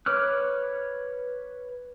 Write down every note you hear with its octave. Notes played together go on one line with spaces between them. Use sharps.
B4 C#5 D6 F6 F#6